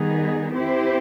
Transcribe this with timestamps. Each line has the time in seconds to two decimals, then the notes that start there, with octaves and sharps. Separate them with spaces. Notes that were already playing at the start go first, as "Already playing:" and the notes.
Already playing: D#3 G3 B3 D#4 G#4
0.55 C4 E4 G4 C5